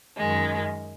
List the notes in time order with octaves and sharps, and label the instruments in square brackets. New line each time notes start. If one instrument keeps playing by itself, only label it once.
[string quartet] F#2 D#3 G#3